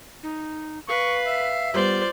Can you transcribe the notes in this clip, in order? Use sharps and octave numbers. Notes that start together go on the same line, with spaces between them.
D#4
B4 F5 C#6
E5
G3 B3 F4 C5 D5